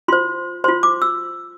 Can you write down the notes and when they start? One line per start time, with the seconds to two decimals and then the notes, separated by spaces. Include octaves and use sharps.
0.08 F4 C5 C6
0.64 F4 C5 C6
0.83 D6
1.02 E6